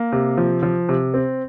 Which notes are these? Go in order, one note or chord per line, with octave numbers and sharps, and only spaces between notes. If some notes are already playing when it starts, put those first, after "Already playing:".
Already playing: A#3
C3
F3
F3
C3
C4